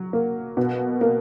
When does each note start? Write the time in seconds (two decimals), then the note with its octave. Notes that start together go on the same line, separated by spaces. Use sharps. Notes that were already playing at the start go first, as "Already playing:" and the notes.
Already playing: F#3
0.13 A#3
0.57 B2
1.01 A#3